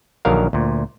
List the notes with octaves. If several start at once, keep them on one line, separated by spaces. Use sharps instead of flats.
A#1 D3 D#3 F#3 A#4 F5
D2 A#2